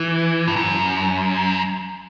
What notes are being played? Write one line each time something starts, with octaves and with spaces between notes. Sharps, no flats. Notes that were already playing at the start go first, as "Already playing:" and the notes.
Already playing: E3
G2
F#2